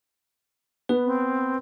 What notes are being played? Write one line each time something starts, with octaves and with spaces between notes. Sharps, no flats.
B3 B4
C4